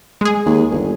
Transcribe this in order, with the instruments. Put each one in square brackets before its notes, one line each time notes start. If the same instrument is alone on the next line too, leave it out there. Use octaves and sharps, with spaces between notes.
[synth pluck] G#3 G#4
[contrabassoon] D#2
G1